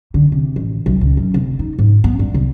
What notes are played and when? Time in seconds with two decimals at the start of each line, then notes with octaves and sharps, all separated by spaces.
0.14 D3
0.32 C3
0.56 A1
0.86 B1
1.01 C#2
1.17 F#2
1.34 F1
1.59 D#4
1.79 G#2
2.04 B3
2.19 G2
2.34 C2